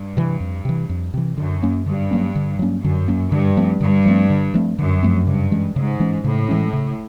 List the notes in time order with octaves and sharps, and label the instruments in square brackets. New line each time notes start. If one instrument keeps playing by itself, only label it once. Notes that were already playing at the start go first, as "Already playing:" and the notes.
Already playing: [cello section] G2
[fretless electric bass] C3 E3
F2
C3 E3
F2
C3 E3
[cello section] F#2 [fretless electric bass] D3
[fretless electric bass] F#3 A#3 C#4
[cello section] G2 [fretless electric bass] D3
[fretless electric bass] F#3 A#3 C#4
D3
F#3 A#3 C#4
[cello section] F#2 [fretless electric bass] D3
[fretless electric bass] F#3 A#3 C#4
[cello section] G2 [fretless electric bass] D3
[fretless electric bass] F3 A3 C4
[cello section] G2 [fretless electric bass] D3
[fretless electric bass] F3 A3 C4
D3
F3 A3 C4
[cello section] F#2 [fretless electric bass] D3
[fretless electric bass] F3 A3 C4
[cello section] G2 [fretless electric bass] C#3
[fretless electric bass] E3 G#3 C#4
[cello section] G#2 [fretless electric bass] C#3
[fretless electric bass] E3 G#3 C#4
[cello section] A2 [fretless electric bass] C#3
[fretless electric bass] E3 G#3 C#4
C#3